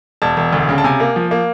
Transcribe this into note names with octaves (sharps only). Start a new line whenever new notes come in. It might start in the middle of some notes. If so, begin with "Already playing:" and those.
E1 A5
E1
D2
C#3
A5
C3 G#5
A#3
F3
A#3